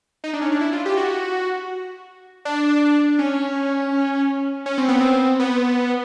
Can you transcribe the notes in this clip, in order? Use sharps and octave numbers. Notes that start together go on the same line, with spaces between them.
D#4
D4
C#4
D4
E4
F4
G4
F#4
D4
C#4
C#4
C4
B3
C4
B3